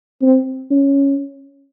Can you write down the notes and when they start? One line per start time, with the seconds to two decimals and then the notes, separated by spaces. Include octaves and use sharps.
0.22 C4
0.71 C#4